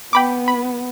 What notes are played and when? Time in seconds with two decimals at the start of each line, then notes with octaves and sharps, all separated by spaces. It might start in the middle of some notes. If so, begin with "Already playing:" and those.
0.13 B3 G5 B5 D6
0.48 B5